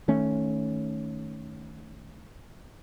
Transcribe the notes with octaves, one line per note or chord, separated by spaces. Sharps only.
D#3 A3 C#4